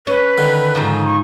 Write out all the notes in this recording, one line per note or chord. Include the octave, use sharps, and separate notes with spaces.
C#4 B4
D3 D#3
G#2 C#3 F3
C#6